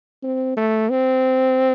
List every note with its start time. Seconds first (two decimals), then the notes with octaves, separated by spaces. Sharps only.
0.23 C4
0.57 A3
0.91 C4